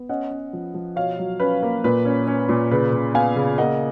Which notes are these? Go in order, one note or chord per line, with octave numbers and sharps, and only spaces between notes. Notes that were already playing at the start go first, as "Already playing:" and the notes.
Already playing: B3
C#4 D#5 F#5
C#4
F3
F3
B2 C#5 F5
F#3
C#4 B4
A#3
A#2 B4
C#4
C#4
A#2
C#3 B4
C#3
B3 F5 G#5
C#3
A#3 D#5 F#5